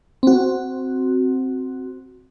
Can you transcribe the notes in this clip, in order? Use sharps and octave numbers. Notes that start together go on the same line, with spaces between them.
C4 F#4